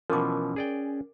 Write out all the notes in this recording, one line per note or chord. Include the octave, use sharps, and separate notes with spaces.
B2 E3 F3 C#4 A#4 D6
G#4 D5 G5